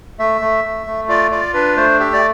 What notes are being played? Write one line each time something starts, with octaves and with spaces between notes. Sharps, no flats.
A3 E5
A3
A3
A3
F4 D5
F4 D5
D4 B4
A3 C5
G4 E5
D5